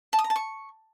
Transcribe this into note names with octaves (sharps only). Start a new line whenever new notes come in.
A5
D#6
A#5
A5
C#6